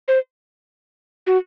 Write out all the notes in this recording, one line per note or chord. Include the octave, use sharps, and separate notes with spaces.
C5
F#4